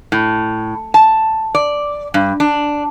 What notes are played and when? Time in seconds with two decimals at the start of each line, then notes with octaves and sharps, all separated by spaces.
0.12 A2
0.94 A5
1.55 D5
2.14 G2
2.40 D4